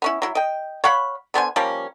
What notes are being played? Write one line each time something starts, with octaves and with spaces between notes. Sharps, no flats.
B3 C#4 E4
F#3 E4
D#5 G5
C#5 F5 F#5 B5
D3 B3 C5 G#5
F3 G3 A#3 C#4